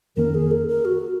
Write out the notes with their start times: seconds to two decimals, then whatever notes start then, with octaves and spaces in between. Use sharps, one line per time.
0.16 F2 D#3 A#3 C#4 A#4
0.34 G#4
0.50 A#4
0.68 A#4
0.84 F#4